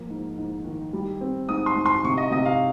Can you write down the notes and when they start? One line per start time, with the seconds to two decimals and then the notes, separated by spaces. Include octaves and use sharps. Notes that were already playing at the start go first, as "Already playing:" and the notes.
Already playing: F3 A#3
0.09 G#2
0.37 G#2
0.64 D#3
0.93 G3
1.21 C4
1.49 G#2 D#6
1.66 C6
1.76 G#2
1.86 C6
2.04 C3 C#6
2.18 D#5
2.31 C3 D#5
2.45 F5